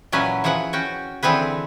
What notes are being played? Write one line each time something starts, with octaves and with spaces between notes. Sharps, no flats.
A#2 E3 F#3 C#4 B4 G#5
E3 F3 G#4 F#5
C#4 F#4 G5
D3 E3 C4 G#4 B4